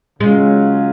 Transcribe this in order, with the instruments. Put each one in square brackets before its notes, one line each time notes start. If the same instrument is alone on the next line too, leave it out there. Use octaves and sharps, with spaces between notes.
[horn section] C#3 F#3 C#4 F4 [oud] G#3